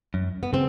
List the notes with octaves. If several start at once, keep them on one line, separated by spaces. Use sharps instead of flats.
F#2
B3
C#3 C4